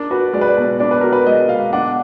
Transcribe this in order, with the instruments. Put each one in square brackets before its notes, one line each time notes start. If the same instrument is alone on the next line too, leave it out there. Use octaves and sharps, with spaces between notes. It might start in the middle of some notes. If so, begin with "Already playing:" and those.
Already playing: [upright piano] D4 [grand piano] A#4
[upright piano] F#4 [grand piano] B4
[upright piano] G#3 [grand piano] D5
[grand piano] B4
D5
[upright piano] B2
[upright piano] D4 [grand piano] D5
[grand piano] B4
[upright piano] F#4 [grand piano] A#4
[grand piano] B4
[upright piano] G#3 [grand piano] D#5
[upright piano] B2 [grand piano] F5
[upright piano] D4 [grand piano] F#5